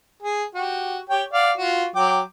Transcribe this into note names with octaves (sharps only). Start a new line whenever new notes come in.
G#4
F#4 G4
G4 C#5 G5
D5 F5 F#5
F4 F#4
F#3 G5 D6